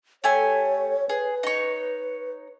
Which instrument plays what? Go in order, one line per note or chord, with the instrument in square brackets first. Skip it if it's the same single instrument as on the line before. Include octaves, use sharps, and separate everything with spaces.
[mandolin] A3 G4 G#5 [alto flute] C#5
[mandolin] G#4 [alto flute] B4
[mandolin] D#4 C#5